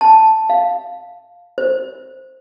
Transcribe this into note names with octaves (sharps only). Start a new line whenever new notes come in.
A5
F5
C5